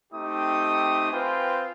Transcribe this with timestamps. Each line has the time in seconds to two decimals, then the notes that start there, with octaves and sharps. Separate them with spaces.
0.13 A3 C4 D#4 G4 D#6
1.12 C4 F4 B4 C5 G5 G#5